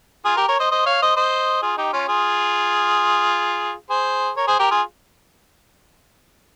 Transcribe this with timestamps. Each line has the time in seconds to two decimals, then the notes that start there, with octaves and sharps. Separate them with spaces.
0.25 F4 G#4
0.36 G4 A#4
0.48 A#4 C#5
0.59 C5 D#5
0.71 C5 D#5
0.86 C#5 F5
1.02 C5 D#5
1.16 C5 D#5
1.62 F4 G#4
1.77 D#4 G4
1.93 C#4 F4
2.08 F4 G#4
3.90 G#4 C5
4.37 A#4 C#5
4.47 G#4 C5
4.59 G4 A#4
4.71 F4 G#4